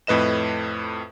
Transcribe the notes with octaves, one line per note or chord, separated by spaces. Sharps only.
F2 A2 B4 D#5 E7